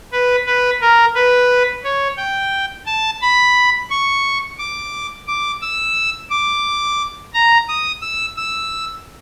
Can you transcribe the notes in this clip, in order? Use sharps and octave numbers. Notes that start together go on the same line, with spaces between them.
B4
B4
A#4
B4
C#5
G5
A5
B5
C#6
D6
D6
E6
D6
A#5
D#6
E6
E6